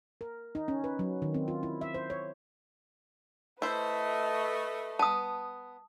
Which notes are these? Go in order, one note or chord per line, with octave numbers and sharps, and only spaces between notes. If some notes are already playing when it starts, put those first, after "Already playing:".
A#4
D#4
C#4
B4
F#3
D#3
C4
F4
E4
E5
C5
C#5
A3 E4 B4 C5 D#5
B3 A5 D#6